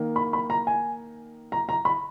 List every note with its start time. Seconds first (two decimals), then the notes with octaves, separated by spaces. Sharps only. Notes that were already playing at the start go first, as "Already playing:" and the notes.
Already playing: D#3 A#3
0.16 B5
0.33 B5
0.50 A#5
0.67 G#5
1.52 A#5
1.69 A#5
1.85 B5